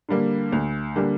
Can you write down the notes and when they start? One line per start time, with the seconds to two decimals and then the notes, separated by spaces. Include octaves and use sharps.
0.09 D3 G3 A#3
0.52 D2
0.96 D3 G3 A#3